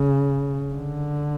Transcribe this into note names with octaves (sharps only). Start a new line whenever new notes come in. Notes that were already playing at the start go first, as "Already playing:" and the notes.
Already playing: C#3
D3